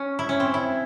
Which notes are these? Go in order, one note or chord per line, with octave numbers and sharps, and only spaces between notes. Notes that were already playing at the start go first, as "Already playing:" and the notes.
Already playing: C#4
E4
C#4
C4
E4